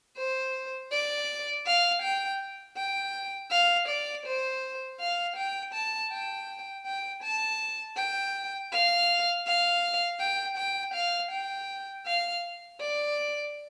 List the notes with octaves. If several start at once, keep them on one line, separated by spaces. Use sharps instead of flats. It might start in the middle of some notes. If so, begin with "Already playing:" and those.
C5
D5
F5
G5
G5
F5
D5
C5
F5
G5
A5
G5
G5
A5
G5
F5
F5
G5
G5
F5
G5
F5
D5